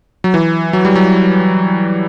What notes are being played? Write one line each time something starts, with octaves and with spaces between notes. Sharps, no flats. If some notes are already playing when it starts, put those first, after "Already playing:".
F#3
E3
F#3
G3
F#3